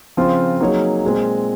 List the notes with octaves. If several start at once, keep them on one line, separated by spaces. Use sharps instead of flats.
C#3 F3 C4 F4
F#3 A#3 D#4 G#4 C#5
A#2 G#3 C4